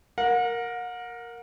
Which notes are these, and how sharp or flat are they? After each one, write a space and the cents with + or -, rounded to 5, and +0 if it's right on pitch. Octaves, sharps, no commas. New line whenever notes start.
A#4 +0 F#5 -40